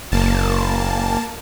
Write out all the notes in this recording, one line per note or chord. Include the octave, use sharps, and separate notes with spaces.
F#1 A#3 A5